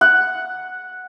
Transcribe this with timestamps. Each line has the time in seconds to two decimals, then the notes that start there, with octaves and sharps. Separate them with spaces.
0.01 F#5